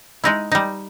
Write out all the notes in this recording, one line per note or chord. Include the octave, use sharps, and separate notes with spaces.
G#3 D#4 E4
G3 D#4